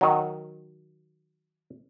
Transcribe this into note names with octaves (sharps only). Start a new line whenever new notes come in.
D#3 F#3